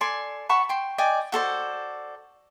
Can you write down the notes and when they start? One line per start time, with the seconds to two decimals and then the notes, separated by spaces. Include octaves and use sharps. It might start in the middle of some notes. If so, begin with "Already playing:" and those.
0.01 A4 D5 G#5 C6
0.49 F#5 A5 B5 C#6
0.69 G5 C6
0.98 D5 D#5 G5 G#5
1.32 F#4 A4 C5 D5